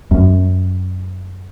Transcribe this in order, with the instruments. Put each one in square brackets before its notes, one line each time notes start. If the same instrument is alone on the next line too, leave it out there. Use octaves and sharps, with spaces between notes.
[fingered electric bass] F#2